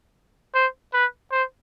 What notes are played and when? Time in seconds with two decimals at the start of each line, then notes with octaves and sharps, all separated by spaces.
0.54 C5
0.94 B4
1.31 C5